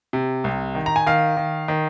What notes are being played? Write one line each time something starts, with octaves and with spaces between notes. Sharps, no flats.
C3
C2
D#3
A#5
G#5
D#3 F5
D#3
D#3